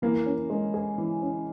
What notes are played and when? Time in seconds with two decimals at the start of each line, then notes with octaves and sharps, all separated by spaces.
0.02 E3 A#3
0.26 C#4
0.50 G#3
0.74 G#4
0.98 E3
1.22 C#4